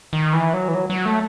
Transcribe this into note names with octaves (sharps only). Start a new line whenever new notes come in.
D#3
E3
F#3
E3
F#3
F#3
A3